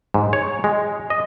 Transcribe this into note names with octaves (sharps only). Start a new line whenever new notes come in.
G#2
C#5
G#3
D#5